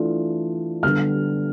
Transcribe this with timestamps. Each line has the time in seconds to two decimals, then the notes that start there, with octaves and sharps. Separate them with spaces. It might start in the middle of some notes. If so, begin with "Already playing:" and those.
Already playing: E3 A3 D4 F4
0.83 D3 G3 B3 F6